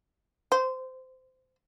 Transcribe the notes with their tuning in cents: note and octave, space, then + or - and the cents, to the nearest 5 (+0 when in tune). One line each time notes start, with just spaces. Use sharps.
C5 -20